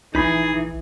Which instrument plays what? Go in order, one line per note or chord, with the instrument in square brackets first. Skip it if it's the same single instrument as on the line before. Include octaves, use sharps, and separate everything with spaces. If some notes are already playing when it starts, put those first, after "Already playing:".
[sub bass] A#1 [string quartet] E3 [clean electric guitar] D#4 B5 [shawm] G#4